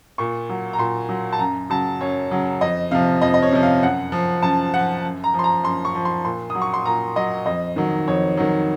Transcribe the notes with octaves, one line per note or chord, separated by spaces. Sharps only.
A#2 C#6
F#3
A#5
A#2 C6
F#3
A5
F#2 A#5
C#3 F#3 A5
F#2 C#5
C#3 F#3
F2 D#5
C3 F3 F5
F2 D#5
D#5
C#5
C3 F3
F5
F#2 F#5
F3
F#2 A5
F3 F#5
F#2
A#5
F3
C6
A#5
F#2 C6
C#6
F3
C6
A#2 C6
D#6
F#3
C#6
C6
A#2 A#5
F#3 D#5
F2 D#5
D#3 F#3
F2 C#5
D#3 F#3